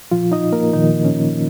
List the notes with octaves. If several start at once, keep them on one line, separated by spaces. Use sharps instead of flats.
A#2 F3 F4
D#4 D#5
A#3 A#4
A#2 D#3 F3 D#4
C#4